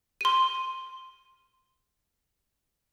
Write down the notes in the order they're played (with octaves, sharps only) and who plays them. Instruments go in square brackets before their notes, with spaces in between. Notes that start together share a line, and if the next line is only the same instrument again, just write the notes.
[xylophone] C6 D#7